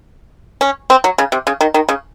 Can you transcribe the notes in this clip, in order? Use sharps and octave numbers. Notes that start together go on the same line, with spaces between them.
C#4
C4
F#3
C#3
C3
C#3
D#3
D#3
C#3